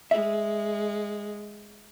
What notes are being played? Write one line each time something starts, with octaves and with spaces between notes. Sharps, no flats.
G#3 E5